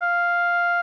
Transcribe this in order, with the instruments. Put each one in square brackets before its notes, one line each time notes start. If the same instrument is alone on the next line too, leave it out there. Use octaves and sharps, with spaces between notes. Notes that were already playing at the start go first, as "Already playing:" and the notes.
[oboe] F5